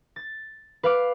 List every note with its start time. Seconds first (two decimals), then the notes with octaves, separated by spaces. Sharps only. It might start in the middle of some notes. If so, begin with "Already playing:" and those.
0.16 A6
0.83 B4 F5 D6